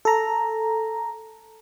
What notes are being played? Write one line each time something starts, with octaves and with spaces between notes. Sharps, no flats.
A4 A#5